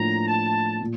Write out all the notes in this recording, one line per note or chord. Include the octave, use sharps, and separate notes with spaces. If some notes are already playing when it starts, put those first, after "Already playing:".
Already playing: A2 F3 A#3 D4 A#5
A5
A#2